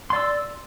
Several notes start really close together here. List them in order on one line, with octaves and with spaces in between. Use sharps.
C6 D5 E6